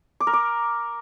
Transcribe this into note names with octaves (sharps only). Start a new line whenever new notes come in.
D6
A#4
D6